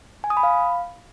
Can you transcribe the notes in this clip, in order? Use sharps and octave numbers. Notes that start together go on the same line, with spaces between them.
G#5
D#6
B5
F5